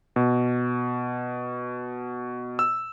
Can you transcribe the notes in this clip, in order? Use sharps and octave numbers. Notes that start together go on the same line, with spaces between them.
B2
E6